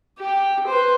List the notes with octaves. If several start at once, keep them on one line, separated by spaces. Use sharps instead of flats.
G4
B4 C5